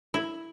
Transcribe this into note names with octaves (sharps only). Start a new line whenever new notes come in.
E4